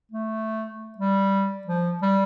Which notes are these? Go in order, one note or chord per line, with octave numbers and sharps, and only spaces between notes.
A3
G3
F3
G3